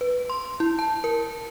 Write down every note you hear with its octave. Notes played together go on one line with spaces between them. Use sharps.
B4
C6
E4
A5
A#4